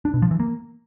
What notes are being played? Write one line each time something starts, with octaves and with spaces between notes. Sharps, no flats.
D4
B2
F3
E3
A#3